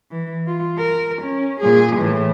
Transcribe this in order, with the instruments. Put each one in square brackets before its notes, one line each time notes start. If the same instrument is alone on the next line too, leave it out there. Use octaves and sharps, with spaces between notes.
[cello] E3
F4
A#4
C#4
A#2 G#4
A2 E3